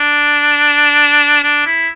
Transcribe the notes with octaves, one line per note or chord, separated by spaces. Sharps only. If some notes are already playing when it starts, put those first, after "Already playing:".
Already playing: D4
D4
E4